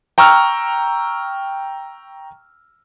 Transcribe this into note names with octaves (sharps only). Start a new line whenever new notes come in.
G5 A#5 C#6 E6 F6